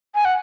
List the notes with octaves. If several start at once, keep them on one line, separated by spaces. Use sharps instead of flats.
G#5
F#5